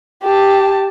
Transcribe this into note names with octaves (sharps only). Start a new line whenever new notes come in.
G4 A5